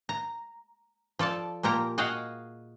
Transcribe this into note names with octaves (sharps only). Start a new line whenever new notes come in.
A#5
F3 A4 D5 A5
A#2 F3 A#3 G4 A#5
F#4 G#4 D#5 F5 G5